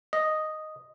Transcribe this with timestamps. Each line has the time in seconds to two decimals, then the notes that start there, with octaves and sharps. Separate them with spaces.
0.13 D#5